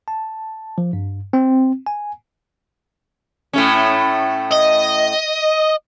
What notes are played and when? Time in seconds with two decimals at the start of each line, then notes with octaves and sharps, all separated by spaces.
0.08 A5
0.78 F3
0.93 G2
1.33 C4
1.86 G#5
3.53 A2 A3 C#4
4.51 D#5